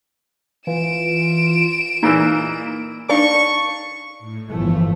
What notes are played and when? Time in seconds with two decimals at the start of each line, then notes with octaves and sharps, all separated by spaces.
0.67 E3 F4 D7 E7
2.03 A#2 E3 A#3 D#4
3.09 D4 D#4 F5 C#6
4.19 A2
4.48 G1 A2 E3 F3 A3